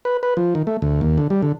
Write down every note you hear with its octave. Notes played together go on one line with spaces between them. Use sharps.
B4
B4
F3
D#3
A3
D2
D#2
D3
G3
D3